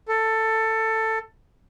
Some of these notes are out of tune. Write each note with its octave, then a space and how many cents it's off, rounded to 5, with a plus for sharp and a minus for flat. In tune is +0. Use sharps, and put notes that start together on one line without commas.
A4 +15